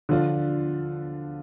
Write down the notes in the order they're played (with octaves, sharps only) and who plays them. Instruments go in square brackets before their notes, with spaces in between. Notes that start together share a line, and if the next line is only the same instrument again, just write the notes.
[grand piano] D3 F3 D4 F4